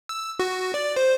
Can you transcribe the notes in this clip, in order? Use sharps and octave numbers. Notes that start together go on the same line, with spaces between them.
E6
F#4
D5
C5